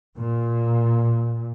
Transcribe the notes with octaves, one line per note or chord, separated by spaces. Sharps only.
A#2